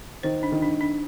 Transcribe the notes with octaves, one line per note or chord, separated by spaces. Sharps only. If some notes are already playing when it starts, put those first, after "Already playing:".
D#3 C5
D4
D#3
D4
D4